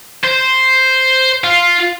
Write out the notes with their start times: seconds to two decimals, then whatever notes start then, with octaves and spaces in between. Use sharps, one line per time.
0.24 C5
1.44 F4